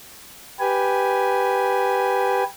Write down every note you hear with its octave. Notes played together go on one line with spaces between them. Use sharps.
G4 B4 G#5